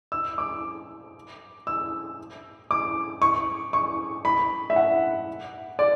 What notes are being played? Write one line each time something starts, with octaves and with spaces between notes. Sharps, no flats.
E6
D6
E6
D6
C#6
C#6
B5
E5
F#5
D5